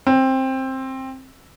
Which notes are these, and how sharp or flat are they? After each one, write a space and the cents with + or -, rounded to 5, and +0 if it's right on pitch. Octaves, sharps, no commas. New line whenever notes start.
C4 +15